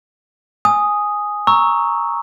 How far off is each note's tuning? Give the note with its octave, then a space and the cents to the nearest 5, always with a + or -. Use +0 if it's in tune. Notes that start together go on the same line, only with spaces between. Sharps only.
G#5 +0 D#6 +0
A#5 +0 C#6 +0 E6 -10